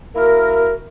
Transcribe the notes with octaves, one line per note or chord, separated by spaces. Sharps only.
A#3 E4 F#4 A#4